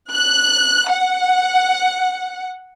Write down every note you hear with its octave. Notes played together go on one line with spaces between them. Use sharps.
F#6
F#5